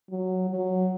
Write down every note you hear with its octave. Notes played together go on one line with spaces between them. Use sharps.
F#3
F#3